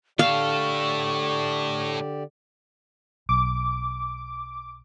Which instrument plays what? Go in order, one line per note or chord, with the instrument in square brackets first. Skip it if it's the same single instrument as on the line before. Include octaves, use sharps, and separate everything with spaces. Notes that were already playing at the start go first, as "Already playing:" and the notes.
[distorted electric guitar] A2 A4 [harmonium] D3 G4 D5 [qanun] F5 [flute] C#6
[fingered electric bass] B1 [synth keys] D6